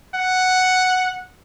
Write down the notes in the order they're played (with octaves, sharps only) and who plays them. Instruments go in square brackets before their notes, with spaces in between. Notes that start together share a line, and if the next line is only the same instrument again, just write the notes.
[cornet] F#5